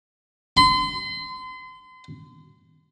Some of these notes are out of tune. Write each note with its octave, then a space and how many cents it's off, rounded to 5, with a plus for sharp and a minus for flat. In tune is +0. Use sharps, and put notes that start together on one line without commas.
C6 -35